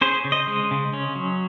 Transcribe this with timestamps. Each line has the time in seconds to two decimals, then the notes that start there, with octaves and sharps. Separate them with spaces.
0.01 C#4 G#4 C5
0.24 C#3
0.32 C5 D#5
0.47 G#3
0.71 C#3
0.93 C#4
1.16 F#3